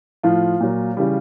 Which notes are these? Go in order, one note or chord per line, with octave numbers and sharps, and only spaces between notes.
A2 F3 F4
A#2 F#3
C#3 E3 G3